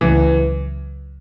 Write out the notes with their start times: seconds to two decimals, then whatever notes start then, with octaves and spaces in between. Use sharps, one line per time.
0.01 C#2 C#3 E3 F#3 A3